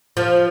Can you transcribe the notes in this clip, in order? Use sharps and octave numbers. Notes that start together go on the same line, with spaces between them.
F3